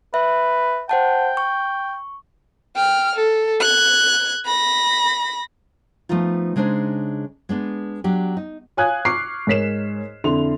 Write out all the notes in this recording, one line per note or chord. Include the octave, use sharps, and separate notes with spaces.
B4 E5
C5 F#5 G5 A5
C#6
G5 F6
A4
F#6 G#6
B5 A#6
F3 A3 B3 D#4 F4
C#3 G#3 D4 D#4 C5
G#3 B3 D4
F#3 D4 G4
D#4
C#5 F5 G#5 D#6 F#6 G#6
C#6 D6 F6 C7
G#2 A#4 C#5 B6 C7 E7
F2 D3 E4 C6 F7